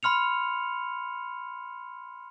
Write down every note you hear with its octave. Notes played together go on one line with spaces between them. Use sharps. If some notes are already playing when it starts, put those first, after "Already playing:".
B5 C6 F6 C#7 F7